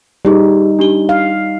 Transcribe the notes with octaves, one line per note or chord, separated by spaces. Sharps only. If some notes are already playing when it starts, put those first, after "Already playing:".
G3 D#4 G4 G#4
D4 G4 G7
F5